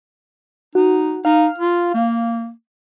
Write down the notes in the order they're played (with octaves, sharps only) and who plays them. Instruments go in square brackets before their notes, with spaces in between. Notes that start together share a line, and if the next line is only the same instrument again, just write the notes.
[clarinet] D#4 [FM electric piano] F#4
[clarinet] D#4 [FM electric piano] F5
[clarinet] F4
A#3